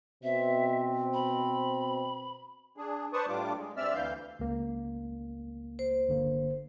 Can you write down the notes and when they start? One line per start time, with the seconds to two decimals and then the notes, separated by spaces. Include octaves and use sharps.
0.23 B2 C4 E5
1.14 B5
2.77 D4 G#4
3.13 B4 C5 D5 A5 C#6 D#6
3.29 A2 G3 D4 F4 D6
3.57 G#3
3.77 G2 C4 D5 E5 E6 F6
3.94 D2 E3 F5 G6
4.39 C#2 A#3
5.79 C5
6.09 G1 D3 A#3